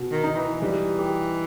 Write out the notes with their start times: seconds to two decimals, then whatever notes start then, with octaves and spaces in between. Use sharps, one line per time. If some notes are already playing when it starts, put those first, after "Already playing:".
Already playing: B2
0.11 D#3
0.24 D#4
0.36 E3
0.61 E3 G3
0.99 G4